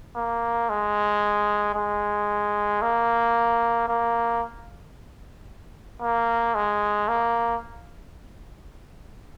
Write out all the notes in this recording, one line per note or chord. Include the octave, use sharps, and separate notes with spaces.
A#3
G#3
G#3
A#3
A#3
A#3
G#3
A#3